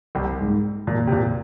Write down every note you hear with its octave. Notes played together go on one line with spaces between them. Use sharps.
C2 C3
G#2
A#2
C3
A#2